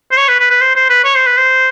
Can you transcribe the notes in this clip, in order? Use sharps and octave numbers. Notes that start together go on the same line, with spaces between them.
C5
C#5
B4
B4
B4
C5
C5
B4
C#5
C5
B4
C5